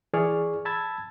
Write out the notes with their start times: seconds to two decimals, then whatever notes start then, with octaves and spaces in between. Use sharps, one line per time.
0.14 E3 G#4 D5 C#6 F6
0.65 A5 B5 E6 G#6 A6